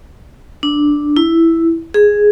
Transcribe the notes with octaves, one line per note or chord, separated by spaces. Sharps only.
D4
E4
G#4